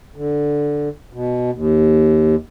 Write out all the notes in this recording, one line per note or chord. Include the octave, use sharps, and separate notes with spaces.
D3
B2
D#2